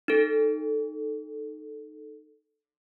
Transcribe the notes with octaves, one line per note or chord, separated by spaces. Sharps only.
D#4 A4